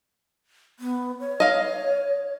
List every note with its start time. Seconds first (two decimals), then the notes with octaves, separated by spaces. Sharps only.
0.79 B3
1.20 C#5
1.40 D#5 F5